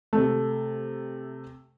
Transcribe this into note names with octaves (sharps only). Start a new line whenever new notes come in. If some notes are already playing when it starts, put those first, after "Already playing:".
C3 A3